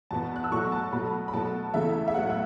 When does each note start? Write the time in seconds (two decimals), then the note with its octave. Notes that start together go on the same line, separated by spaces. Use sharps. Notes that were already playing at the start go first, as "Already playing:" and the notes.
0.11 E2 B2 B3 A5
0.36 F#6
0.44 E6
0.51 B2 F#3 A3 C#6
0.72 A5
0.92 B2 F#3 A3 B5
1.28 B5
1.33 B2 F#3 A3 A5
1.74 E2 C#3 E3 A3 E5
2.08 E5
2.14 A2 F#3 B3 F#5
2.30 E5